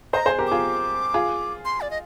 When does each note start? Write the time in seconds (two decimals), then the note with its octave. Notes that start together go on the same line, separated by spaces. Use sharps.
0.13 C5 D#5 A#5
0.26 G#4 C5
0.39 G4 A#4
0.47 F4 G#4 D6
1.14 F4 G#4
1.65 C6
1.81 D5
1.91 D#5